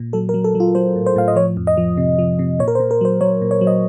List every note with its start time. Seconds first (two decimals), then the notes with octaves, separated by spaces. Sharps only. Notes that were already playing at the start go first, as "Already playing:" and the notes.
Already playing: A#2
0.13 F#3 A4
0.29 A#4
0.34 F#3
0.44 A4
0.55 F#3
0.60 F4
0.75 F#3 C5
0.96 A2
1.06 C5
1.16 A2 F5
1.28 D#5
1.36 F3 C#5
1.57 F2
1.67 D#5
1.77 F3
1.97 C3
2.19 F3
2.39 C3
2.59 A#2 C#5
2.68 A#4
2.75 C5
2.80 A#2
2.91 A#4
3.01 F#3 C5
3.21 F#3 C#5
3.42 A#2
3.51 C#5
3.61 F#3
3.67 D#5